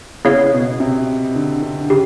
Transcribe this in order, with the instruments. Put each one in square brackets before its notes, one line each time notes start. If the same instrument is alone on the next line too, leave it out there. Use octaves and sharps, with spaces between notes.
[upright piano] C#3 [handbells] B3 E4 G#4 C#5 F5
[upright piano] B2
C3
D3
D3
[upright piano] C#3 [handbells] G4